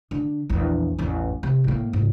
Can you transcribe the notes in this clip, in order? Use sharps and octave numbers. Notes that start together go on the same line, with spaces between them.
D3
A#1 E2
A1 E2
C3
A2 A#3
G#2 C#3